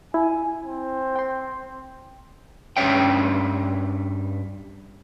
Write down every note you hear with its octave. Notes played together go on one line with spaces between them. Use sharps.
E4 G#5
C4
G5 C6
G2 C#4 C#5 E5 G5